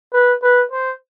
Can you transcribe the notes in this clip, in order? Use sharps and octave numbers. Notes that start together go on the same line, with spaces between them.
B4
B4
C5